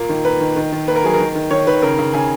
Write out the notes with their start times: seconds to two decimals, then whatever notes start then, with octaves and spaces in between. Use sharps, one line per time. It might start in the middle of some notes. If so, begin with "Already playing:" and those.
Already playing: A#2 A#3
0.09 D#3
0.25 A#3 B4
0.41 D#3
0.56 D#3
0.72 D#3
0.88 A#3 B4
0.96 A#4
1.04 F#3 G#4
1.14 A#4
1.20 D#3
1.35 D#3
1.51 D#3 C#5
1.67 D#3 B4
1.82 C#3 A#4
1.99 C#3
2.14 C#3 G#5